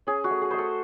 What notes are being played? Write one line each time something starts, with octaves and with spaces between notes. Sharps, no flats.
C#4 G#4
F#4
A3
G#4
A3 C5
A4